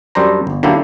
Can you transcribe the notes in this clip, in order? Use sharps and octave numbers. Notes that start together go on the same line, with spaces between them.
F#2 G3 D4 C5 A#5
G1
D3 F#3 A#3 D4 E4 G4